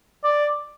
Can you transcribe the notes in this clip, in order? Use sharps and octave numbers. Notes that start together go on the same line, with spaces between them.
D5